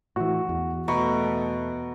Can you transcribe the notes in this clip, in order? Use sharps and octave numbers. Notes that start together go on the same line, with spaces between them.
A2 E3 F#4
E2
B2 A3 A#5 B5 C#6